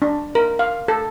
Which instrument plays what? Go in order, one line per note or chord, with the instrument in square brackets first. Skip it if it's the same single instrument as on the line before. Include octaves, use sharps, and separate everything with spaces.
[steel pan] D4
A#4
F5
A4